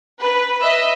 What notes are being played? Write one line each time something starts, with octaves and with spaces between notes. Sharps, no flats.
B4
D#5 E5